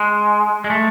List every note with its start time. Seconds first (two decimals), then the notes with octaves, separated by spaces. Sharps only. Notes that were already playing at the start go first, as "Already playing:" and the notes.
Already playing: G#3
0.64 G#3
0.70 A3